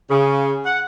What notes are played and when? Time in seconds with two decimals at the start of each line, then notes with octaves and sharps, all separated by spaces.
0.11 C#3
0.66 F#5